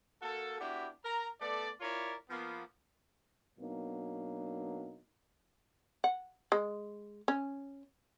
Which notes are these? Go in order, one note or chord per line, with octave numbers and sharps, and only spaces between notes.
A#3 F#4 A4
B3 D4 E4 F#4 G4
A#4 A#5
A3 B3 A4 D5
E4 F4 A#4 C#5 D5
F3 A#3 B3
B2 F#3 A#3 B3 D4 D#4
F#5
G#3
C#4